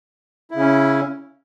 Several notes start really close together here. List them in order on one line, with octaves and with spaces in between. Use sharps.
E4 C#3 C#4